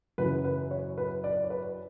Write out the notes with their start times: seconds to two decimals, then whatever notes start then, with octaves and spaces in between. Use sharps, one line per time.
0.18 F#2 C#3 E3 B4
0.44 B4
0.71 C#5
0.98 B4
1.24 D5
1.44 C#5
1.50 B4